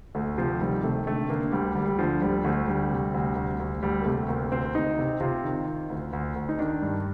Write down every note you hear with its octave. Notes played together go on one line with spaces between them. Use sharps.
D2 A3
C3 F3
D#3 G3
C3 A3
D3 A3
D3 A#3
D2 G3
D2 G3
G3
D3 F3
D2 G3
D2 A3
D3 G3
C3
D2
D2
D2
D2 G3
A#3
C3 A3
D2 A#3
D2 C4
D2 D#4
C3
C3 F4
D#3
D#3
D2
D2
D2
D#4
D#3 D4
G2